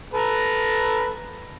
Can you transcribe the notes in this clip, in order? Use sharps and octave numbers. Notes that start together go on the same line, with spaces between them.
A4 B4 A#5